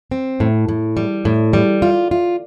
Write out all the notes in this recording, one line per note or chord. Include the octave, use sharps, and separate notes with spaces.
C4
A2
A2
G3
A2
G3
F4
F4